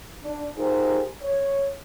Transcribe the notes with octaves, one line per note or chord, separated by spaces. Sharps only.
D4
D#4 F4 G4 G#4 A#4 C5
C#5